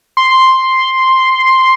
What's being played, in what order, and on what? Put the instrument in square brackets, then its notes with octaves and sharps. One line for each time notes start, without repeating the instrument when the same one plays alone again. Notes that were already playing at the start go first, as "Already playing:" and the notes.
[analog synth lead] C6